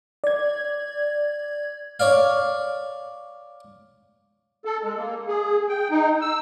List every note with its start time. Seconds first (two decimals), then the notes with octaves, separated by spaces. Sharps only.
0.24 D5 G#6
2.00 C#5 D5 F5
4.65 A4
4.83 G#3
4.96 A#3
5.27 G#4
5.69 G5
5.90 D#4
6.21 E6